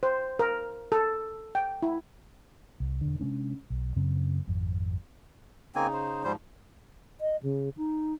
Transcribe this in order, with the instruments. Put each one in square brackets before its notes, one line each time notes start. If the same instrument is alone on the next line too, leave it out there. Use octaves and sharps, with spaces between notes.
[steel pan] C5
A#4
A4
G5
E4
[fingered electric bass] C2
E1 D3
C3 G#3 C#4 D4
B1
F#2 C#3 C4
G#1 F2
[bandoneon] C#3 D#4 [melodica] A#3 C4 G#5
[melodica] C5
[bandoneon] G#2 F3 [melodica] G3 C5
[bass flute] D#5
C#3
D#4